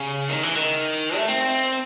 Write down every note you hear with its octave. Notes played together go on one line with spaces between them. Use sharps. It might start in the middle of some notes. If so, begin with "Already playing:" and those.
Already playing: C#3
D#3
E3
D#3
A3
C4